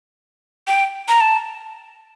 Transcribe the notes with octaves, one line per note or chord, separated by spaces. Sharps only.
G5
A#5
A5